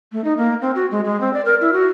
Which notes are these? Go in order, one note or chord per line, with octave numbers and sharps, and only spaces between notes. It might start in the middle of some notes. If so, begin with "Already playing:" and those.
A3
D#4
A#3
C4
F#4
G#3
G#3
C4
D5
A#4
E4
F#4